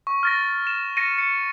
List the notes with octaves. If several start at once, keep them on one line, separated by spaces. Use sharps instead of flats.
C#6
F6 A6 A#6
E7
A#6 C#7 D#7
C#7